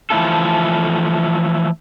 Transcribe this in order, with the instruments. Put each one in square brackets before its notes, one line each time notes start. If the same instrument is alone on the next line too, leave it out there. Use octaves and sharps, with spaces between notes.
[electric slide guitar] E3 F3 A3 E4 F4 A4